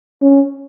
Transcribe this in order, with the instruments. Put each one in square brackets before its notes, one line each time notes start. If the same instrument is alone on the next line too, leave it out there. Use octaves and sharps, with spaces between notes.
[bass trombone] C#4